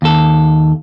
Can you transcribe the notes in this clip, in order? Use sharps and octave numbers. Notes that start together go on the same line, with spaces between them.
D#2 A4